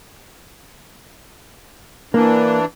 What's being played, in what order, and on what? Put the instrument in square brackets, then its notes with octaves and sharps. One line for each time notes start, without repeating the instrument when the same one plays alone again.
[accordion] E3 D4 [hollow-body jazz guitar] A#3